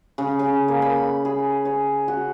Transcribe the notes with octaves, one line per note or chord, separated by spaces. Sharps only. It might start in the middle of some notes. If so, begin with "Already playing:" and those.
C#3
C#3
A#3
B5
G#4
C#5
F#4